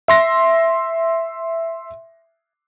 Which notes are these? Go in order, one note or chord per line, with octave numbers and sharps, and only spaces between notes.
E5 C6 A#6